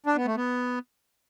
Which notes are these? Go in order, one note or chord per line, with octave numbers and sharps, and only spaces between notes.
D4
B3
A3
B3